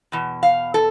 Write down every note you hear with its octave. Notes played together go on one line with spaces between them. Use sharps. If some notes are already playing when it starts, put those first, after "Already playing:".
E2 B2
F5
A4